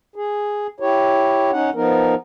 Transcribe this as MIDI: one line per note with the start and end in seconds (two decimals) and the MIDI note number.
0.16 0.67 68
0.80 1.51 64
0.80 1.51 67
0.80 1.51 73
1.52 1.70 61
1.52 1.70 63
1.52 1.70 78
1.75 2.15 53
1.75 2.15 59
1.75 2.15 63
1.75 2.15 70